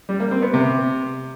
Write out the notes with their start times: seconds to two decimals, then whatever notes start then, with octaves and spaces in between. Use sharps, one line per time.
0.09 G3
0.20 A#3
0.31 C4
0.42 B3
0.54 C3